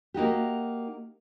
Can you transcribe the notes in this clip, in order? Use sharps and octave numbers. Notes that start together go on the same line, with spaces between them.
A#3 D#4 F#4 G4